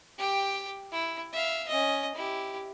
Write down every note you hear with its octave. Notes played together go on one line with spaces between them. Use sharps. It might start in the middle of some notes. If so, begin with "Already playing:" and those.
G4 G5
E4
E5 F5
C#4 D#5
E4 G4